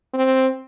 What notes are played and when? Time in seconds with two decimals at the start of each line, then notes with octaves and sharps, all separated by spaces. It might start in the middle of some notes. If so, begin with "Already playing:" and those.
0.14 C4